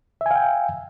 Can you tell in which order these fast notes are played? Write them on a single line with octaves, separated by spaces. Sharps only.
E5 G#5 F5 G5